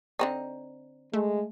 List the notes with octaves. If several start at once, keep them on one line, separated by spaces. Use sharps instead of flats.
D3 C4 D#4
G#3 A3